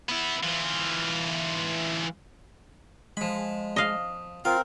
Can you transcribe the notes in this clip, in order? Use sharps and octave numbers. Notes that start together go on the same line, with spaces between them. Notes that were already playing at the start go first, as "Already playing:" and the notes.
B3 E4
E3 F4
F3 G#3 B5
D#5 F5
C4 F4 A#4 F5